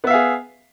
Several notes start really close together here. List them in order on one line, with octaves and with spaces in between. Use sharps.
B3 E5 F5 G#4